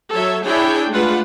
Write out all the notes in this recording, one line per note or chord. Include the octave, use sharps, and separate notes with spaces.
F#3 A4 C#5 E5
D4 E4 G#4 C#5 G5 G#5
G#3 A3 D4 F4 B4 F#5